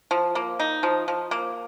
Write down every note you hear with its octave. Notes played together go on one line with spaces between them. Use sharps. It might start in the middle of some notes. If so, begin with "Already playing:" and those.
F3
A#3
D#4
F3
F3
A#3